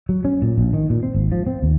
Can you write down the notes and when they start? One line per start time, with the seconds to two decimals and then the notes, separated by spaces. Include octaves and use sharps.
0.09 F#3
0.25 C#4
0.42 A#2
0.58 A#1
0.73 D#3
0.90 A#2
1.03 C4
1.15 G#1
1.32 F3
1.47 C4
1.62 D#2